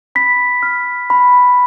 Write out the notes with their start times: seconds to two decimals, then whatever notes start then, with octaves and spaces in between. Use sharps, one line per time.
0.15 B5 B6
0.63 F6
1.10 B5